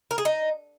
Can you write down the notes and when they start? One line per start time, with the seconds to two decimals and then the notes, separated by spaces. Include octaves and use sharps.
0.11 A#4
0.18 G#4
0.25 D#4